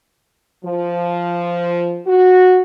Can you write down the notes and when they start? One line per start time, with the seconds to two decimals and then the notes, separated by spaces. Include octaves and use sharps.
0.64 F3
2.06 F#4